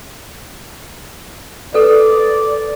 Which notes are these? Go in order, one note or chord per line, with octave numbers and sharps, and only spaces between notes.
A4 B4 D5